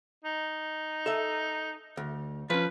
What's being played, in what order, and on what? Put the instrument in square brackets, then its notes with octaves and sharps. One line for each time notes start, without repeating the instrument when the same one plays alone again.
[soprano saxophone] D#4
[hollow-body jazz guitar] A4 E5
D2
[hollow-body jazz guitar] F3 C#4 [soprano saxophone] B4